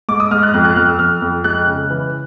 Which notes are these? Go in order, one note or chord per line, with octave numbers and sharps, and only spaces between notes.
G#2 D6
D#6
G#2 F6
F#6
F2 F6
F#6
F2 F6
E6
F2 F6
F2
G#3 F#6
C#3
E3